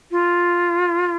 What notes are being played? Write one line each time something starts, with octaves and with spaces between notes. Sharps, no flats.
F4